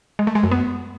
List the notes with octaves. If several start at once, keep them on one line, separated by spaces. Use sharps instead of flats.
G#3
A3
G#3
F#2
B3